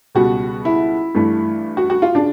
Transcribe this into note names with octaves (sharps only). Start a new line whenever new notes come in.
C#2 B2 G3 F#4
E4
G2 E3 A3
F#4
F#4
F4
C#3 D4